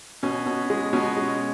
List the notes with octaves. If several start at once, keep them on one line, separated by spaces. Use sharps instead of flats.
B2 C#4
B2
G#3
B2 C#4
G#3